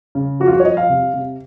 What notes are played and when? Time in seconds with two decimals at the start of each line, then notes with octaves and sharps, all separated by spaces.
0.15 C#3
0.40 F3 F#4
0.47 F4
0.53 F#4
0.60 C#5
0.65 F3 D#5
0.77 F5
0.89 C3
1.14 C3